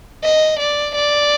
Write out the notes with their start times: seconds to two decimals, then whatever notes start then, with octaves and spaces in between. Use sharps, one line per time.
0.24 D#5
0.59 D5
0.95 D5